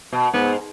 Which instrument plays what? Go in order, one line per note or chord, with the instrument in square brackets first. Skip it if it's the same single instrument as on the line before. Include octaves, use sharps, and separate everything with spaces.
[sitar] B2
[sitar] G#2 [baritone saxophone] B3